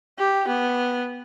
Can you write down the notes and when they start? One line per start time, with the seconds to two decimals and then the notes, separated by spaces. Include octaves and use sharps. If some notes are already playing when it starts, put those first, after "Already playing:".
0.19 G4
0.48 B3